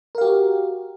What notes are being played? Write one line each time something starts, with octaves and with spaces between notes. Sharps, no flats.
F#4 G4 A#4 F5